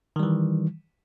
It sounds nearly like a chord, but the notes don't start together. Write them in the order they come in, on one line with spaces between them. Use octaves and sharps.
D#3 G3 E3